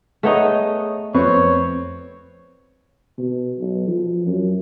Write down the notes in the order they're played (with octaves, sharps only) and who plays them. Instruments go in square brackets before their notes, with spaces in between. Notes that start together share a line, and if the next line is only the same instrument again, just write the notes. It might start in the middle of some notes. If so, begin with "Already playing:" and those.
[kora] A3 B3 D#4 [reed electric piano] G#4 C#5 D#6
[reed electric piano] F2 [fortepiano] C4 B4 C#6 [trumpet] C#5
[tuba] B2
B1
F3
F#2